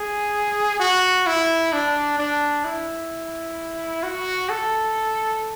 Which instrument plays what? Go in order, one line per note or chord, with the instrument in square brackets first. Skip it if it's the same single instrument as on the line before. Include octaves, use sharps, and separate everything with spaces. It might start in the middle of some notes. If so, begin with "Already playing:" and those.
Already playing: [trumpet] G#4
F#4
E4
D4
D4
E4
F#4
A4